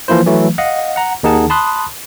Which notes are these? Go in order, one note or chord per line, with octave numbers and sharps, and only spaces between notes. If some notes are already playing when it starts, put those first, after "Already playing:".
E3 F3 A#3 E4 C5
E3 F#3 A3
D#5 F5 F#5
F#5 A#5
D#2 D#3 D#4 G#4 F#5 A5
A5 B5 C6 D#6 F#6